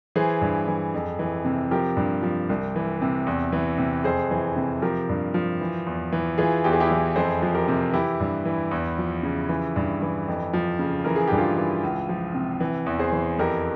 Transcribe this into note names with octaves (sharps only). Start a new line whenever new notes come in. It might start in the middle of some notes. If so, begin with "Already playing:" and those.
E3 G#4 C5
G2
E3
F2
E3
C3
F3 G4 A#4
G2
F3
C2
E3
C3
E2
E3
C3
F2 G#4 C5
E3
C3
F3 G4 A#4
G2
F3
E3
E2
E3
E3 F4 G#4
E2 G4
G#4
E4 G4
E3
F2 G#4 C5
F3
G4 A#4
C3
E3 E4 G4
G2
E3
E2
F3
C#3
E3
G2
E3
F2
F3
C#3
E3 A#4
G#4
G2 G4
F4 G#4
E3
C#2
F3
C3
E3
E2
G#4 C5
E3
F2 G4 A#4